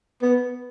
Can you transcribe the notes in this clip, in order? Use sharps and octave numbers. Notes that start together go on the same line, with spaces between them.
B3